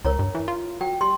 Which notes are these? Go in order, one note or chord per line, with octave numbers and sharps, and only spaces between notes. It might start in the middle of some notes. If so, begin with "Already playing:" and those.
C#2 A#4 C#5 A#5
G2
E3
F4
F#3 G5
G3 C6